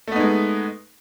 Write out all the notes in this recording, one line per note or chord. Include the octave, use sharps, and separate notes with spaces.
G#3 A3 B3 D#4